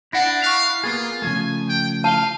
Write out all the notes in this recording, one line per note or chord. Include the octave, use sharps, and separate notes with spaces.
D4 E4 F#5 A#6
F5 C#6 F#6 F7
A#3 B3 F4 G#4
C#3 F3 A3 G#5
G5
F5 A5 D#7 G7